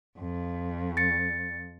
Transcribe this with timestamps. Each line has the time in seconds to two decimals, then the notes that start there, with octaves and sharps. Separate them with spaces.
0.18 F2
0.97 A6 C#7